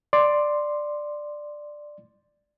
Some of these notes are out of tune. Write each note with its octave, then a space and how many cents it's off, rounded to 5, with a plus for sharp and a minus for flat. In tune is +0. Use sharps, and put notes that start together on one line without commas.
D5 +10 C6 +0